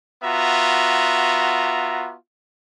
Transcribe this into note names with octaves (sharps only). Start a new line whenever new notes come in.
B3 F4 F#4 E5 A#5